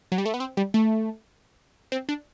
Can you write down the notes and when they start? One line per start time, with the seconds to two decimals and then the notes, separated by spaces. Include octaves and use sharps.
0.12 F#3
0.18 G3
0.26 A3
0.34 B3
0.40 C4
0.57 G3
0.74 A3
1.92 C4
2.09 D4